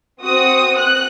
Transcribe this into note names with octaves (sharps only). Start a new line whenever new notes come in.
C4 F#4 D#6
F#6